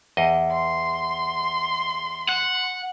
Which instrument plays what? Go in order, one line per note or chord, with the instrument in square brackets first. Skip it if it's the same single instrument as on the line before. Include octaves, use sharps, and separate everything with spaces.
[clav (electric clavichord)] E2 D#5
[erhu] C6
[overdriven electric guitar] F#5